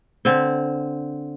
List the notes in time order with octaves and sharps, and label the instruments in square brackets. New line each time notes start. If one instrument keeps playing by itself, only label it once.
[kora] D3 C4